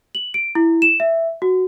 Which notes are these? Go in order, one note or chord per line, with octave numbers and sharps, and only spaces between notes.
F#7
D7
E4
E7
E5
F#4